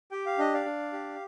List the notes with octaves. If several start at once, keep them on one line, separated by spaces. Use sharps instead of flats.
G4 G5
F5
D4 D#5
D5 F5
D4
G4